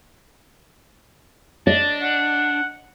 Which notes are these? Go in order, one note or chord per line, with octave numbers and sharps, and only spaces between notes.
D4 D#5 A5
F#5